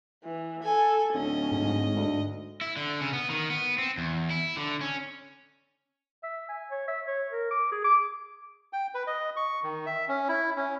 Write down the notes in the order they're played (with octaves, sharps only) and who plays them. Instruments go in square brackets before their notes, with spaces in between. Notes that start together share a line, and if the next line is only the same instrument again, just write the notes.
[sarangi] E3
[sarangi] A4 [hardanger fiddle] G#5
[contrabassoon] D1 [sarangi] C#4 [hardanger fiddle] D#5
[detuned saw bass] G#2
[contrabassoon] D2
[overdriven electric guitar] E4
D3
C#3
B3
D#3
B3
C4
E2
E4
D3
C#4
[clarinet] E5
G#5
C#5
E5
C#5
A#4
D6
G#4
D6
[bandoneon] G5
B4
D#5
C#6
D#3
E5
C#4
E4
C#4